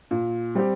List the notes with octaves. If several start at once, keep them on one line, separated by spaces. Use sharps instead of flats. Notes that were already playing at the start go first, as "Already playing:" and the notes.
A#2
G3 C4 G4